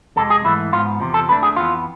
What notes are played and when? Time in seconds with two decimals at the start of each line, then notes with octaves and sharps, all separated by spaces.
0.16 F2 C3 G#3 A4
0.30 G#4
0.44 G#2 E3 A3 E4
0.72 G#2 F3 B3 F4
1.00 E2 C3 F3
1.14 A4
1.28 F2 D3 A3 D4 B4
1.43 G#4
1.56 F2 E3 B3 F4